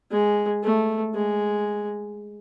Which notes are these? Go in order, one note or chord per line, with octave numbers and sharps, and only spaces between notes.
G#3
A3
G#3